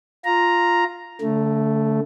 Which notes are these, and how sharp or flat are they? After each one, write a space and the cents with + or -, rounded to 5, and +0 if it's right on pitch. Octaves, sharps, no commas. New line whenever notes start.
F4 +0 A#5 +0
D3 -40 A3 +0